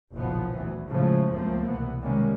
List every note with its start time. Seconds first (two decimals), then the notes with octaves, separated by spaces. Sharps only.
0.14 F#1 B1 A#2 F3 B3
0.56 D2 E3
0.88 A2 C#3 E3 F3 G#3 A3
1.32 C#2 F#2 F3 A3 A#3 C4
1.68 C2 B2 E3 B3
2.02 C3 D#3 G3 G#3 A#3 C#4